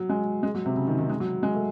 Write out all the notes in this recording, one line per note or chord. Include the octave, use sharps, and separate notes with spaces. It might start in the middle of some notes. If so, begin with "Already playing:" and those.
Already playing: F#3
G#3
G#3
F#3
C3
C#3
D#3
D#3
G#3
F#3
G#3
A3